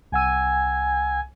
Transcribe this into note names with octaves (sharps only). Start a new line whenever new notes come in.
C2 F#5 G#5 E6